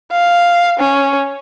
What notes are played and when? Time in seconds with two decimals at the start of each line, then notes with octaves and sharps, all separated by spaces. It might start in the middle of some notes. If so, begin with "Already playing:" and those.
0.12 F5
0.79 C#4